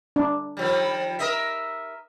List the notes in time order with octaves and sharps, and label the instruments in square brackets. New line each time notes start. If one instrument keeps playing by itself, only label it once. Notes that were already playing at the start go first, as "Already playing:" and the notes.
[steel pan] D4
[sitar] D#3 F3 G3
A#4 D#5 E5